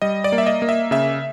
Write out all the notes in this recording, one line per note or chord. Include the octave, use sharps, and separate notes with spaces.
G3 D#5
D5
A#3
E5
D#5
A#3
E5
C#3 E5